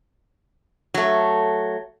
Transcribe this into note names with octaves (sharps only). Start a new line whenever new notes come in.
F#3 A3